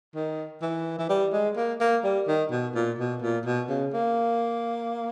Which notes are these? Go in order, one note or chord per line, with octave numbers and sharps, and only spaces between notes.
D#3
E3
E3
G3
G#3
A#3
A#3
G3
D#3
B2
A#2
B2
A#2
B2
C#3
A#3